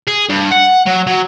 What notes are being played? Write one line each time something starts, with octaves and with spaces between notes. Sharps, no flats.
G#4
G2
F#5
F#3
F#3